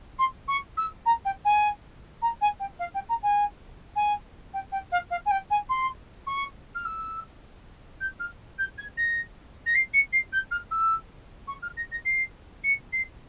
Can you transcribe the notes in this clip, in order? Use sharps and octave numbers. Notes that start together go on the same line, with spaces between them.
C6
C#6
E6
A#5
G5
G#5
A#5
G#5
G5
F5
G5
A#5
G#5
G#5
G5
G5
F5
F5
G#5
G5
G#5
C6
C#6
F6
E6
G6
F6
G6
G#6
A#6
A#6
C7
C#7
C7
G6
F6
E6
C#6
F6
A#6
A#6
C7
C#7
C7